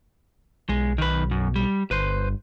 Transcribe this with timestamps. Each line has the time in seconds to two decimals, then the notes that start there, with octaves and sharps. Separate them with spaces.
0.69 B1 G#3
0.98 D#3 B4
1.31 F#2
1.56 G3
1.91 G1 B4 C5